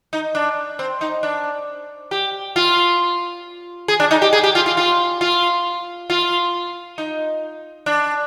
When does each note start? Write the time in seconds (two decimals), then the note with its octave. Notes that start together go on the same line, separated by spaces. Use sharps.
0.13 D#4
0.35 D4
0.79 C4
1.01 D#4
1.23 D4
2.11 G4
2.56 F4
3.88 G#4
4.00 D4
4.11 D#4
4.22 G4
4.33 G#4
4.44 G4
4.55 F4
4.66 F4
4.77 F4
5.21 F4
6.10 F4
6.98 D#4
7.86 D4